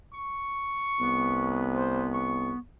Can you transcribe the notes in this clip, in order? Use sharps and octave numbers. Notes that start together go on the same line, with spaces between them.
C#6
C2 B3
C5
C#6